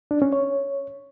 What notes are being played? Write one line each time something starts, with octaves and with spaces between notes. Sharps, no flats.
D4
C#4
C#5